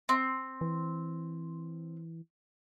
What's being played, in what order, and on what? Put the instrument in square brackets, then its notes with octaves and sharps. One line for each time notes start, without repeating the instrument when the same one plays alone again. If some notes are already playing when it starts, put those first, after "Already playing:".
[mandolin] C4
[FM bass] E3